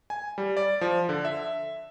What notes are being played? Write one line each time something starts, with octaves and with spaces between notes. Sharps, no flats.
G#5
G3
D5
F3
D3
E5